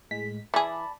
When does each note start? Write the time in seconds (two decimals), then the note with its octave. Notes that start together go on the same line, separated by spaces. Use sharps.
0.11 A2 G#3 B6
0.54 E3 G#4 D5 A5 B5